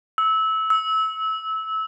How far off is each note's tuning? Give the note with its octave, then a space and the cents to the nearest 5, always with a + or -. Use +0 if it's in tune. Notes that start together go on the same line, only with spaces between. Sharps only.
E6 -20
E6 -25